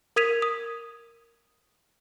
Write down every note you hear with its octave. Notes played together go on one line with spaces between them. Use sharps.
A#4 D#6 G#6 B6 D#7 F7
D#6